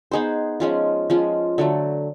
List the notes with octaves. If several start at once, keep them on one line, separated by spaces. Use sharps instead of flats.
B3 D#4 G#4 C5
F3 G#3 C#4 F4
F3 G#3 C#4 F4
D3 F#3 A3